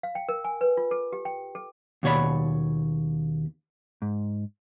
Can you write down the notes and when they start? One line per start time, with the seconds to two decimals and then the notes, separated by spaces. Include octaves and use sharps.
0.03 F5
0.15 G5
0.29 A#4
0.45 G#5
0.61 B4
0.77 F4
0.91 A4
1.12 G4
1.25 G5
1.55 A4
2.03 D#2 B2 C#5 D5 B5
4.02 G#2